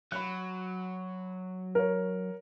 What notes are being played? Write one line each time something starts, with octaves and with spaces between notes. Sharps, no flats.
F#3 B5 F#6
A#4 C#5